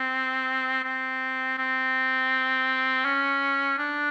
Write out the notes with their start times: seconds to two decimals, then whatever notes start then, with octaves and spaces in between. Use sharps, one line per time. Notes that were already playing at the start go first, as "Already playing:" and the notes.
Already playing: C4
0.84 C4
1.58 C4
3.05 C#4
3.78 D4